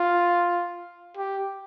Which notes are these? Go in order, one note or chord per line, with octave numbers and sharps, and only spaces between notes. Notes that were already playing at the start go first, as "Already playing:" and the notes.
Already playing: F4
G4